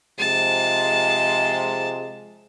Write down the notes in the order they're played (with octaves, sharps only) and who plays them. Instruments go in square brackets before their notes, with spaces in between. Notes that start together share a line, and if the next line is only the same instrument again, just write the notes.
[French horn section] C3 F3 G#3 [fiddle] A5